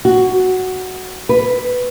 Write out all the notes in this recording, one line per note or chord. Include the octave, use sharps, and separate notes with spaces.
F#4
B4